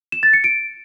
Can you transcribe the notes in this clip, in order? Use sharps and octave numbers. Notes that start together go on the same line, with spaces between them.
E7
A6
C#7
D7